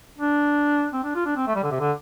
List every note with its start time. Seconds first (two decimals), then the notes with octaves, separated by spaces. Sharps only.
0.18 D4
0.93 C4
1.04 D4
1.15 F4
1.25 D4
1.36 C4
1.47 A3
1.55 G3
1.63 D3
1.71 C3
1.80 D3